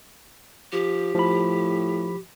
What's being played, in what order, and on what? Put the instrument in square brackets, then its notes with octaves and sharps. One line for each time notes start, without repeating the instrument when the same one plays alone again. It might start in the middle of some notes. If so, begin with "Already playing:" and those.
[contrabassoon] F3 [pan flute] G4
[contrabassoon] A2 [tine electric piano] F3 B5